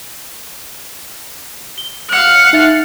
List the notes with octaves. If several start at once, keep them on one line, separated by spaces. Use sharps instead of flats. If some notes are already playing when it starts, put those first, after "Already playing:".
G7
F5 F#5
D#4 E5 A6